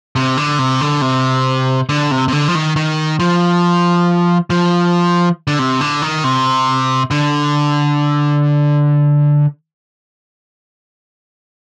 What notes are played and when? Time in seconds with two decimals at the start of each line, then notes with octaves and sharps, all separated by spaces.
0.16 C3
0.37 D3
0.59 C3
0.81 D3
1.02 C3
1.89 D3
2.11 C3
2.28 C3
2.33 D3
2.48 F3
2.55 D#3
2.76 D#3
3.20 F3
4.50 F3
5.47 D3
5.59 C3
5.81 D3
6.02 D#3
6.24 C3
7.11 D3